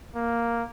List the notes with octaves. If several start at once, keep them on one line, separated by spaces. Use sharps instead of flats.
A#3